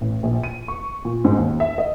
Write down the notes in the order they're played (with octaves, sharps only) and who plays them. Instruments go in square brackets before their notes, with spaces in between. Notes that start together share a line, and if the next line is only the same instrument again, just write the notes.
[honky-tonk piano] A1
A#1
D#7
C#6
A#2
G#2
D#2
E5
D#5